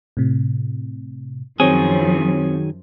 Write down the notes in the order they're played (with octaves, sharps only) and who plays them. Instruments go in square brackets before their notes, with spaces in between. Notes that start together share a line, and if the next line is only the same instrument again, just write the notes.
[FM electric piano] A2 C3
[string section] F#2 F3 [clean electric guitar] D#3 F#3 G#4 [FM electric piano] C4 C#5